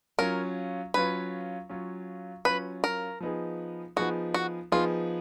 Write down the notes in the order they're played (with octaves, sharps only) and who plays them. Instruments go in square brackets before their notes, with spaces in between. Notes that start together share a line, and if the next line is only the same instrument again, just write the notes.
[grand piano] F#3 C#4 F4 [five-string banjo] A#4
[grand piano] F#3 C#4 F4 [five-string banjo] B4
[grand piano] F#3 C#4 F4
[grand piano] F#3 C#4 F4 [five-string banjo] B4
[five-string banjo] A#4
[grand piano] F3 B3 D#4 G#4
[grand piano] F3 B3 D#4 G#4 [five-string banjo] F#4
[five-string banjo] F#4
[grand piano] F3 B3 D#4 G#4 [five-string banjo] F4